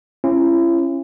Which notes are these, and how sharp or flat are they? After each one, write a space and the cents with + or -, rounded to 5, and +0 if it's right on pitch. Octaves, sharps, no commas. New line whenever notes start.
C#4 -30 E4 +40